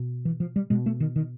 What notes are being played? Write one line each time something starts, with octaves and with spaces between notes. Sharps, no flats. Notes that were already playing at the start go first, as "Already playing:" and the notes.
Already playing: B2
E3
F3
G3
B2 G#3
A3
D#3
D#3